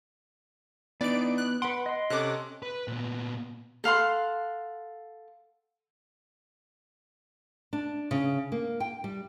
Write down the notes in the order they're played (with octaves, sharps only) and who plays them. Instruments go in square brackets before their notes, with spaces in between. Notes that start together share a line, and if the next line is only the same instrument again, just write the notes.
[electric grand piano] E3 D4 D#4 [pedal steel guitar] B3 [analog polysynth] D5 D7
[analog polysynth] F#6
[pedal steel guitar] B4 C6 [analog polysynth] F#5 [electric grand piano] D7
[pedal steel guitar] D#5 C6
[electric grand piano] C3 C#4 A4 [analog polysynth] D6 F#6
[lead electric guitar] B4
A#2 B3
[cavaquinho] A4 F5 F#5 C6
[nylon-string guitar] D4
C#3
A#3
G5
G3